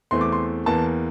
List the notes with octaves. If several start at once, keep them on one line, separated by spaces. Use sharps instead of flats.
E2 E3 A3 C4 C6
D6
C6
E2 E3 A#3 A5